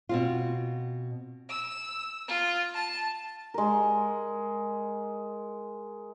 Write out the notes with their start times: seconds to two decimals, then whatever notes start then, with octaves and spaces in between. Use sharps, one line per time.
0.09 B2 C4 F4
1.48 E6
2.27 F4
2.72 A5
3.54 G#3 A#4